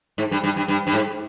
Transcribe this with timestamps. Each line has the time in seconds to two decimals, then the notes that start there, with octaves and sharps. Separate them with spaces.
0.18 G#2
0.31 G2
0.44 G2
0.56 G2
0.68 G2
0.87 G2
0.93 G#2